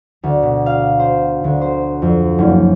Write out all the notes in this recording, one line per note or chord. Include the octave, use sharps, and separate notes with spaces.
D2
B2
F5
C5
D2
C5
F2
F#1